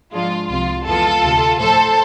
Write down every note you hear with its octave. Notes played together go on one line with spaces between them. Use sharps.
G#2 F3 G#3 D4 F4
C2 C3 F3 F4
F2 E3 G#3 B3 F4 A4
D2 C3 F3
A2 F3 A3 A4 C5